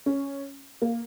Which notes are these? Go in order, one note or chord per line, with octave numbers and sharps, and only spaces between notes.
C#4
A#3